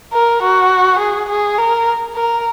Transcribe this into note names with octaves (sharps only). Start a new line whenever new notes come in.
A#4
F#4
G#4
G#4
A#4
A#4